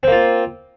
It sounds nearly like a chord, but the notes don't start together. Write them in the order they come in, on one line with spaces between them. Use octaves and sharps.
C4 A#3 F4